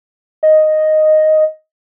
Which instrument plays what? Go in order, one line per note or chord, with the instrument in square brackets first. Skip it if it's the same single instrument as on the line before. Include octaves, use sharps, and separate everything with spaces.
[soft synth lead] D#5